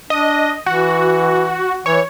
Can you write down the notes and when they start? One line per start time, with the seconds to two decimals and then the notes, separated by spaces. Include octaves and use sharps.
0.10 D4 D#5
0.66 E3 F#4
1.86 E3 C#5